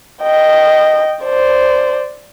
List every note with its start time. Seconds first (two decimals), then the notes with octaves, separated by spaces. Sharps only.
0.23 D#5 G5
1.24 C5 D5